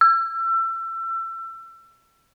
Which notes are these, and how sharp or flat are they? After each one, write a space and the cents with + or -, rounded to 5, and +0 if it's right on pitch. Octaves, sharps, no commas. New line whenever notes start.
E6 +30